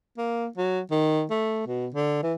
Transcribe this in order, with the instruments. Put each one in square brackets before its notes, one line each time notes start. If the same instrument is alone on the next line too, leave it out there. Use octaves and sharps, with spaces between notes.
[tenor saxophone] A#3
F#3
D#3
A3
B2
D3
E3